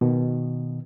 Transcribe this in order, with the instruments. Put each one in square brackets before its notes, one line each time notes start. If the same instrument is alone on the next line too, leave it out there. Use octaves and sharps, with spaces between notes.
[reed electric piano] B2 D#3